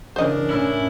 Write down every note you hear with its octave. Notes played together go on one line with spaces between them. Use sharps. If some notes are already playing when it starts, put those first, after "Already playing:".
C#3 E3 D4 A#4 C5 D#5
A2 C#4 E4